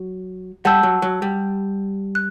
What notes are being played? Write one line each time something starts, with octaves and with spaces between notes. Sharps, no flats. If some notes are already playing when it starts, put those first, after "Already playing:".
Already playing: F#3
G3 F#5 A5 E6 G6
F#3
F#3
G3
F#6